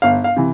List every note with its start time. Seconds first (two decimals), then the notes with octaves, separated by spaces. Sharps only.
0.02 G1 F5
0.24 F5
0.36 C3 E3